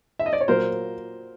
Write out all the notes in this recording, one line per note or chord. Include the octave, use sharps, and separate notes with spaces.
E5
D#5
D5
C#5
A#2 F#3 A#3 A#4 C5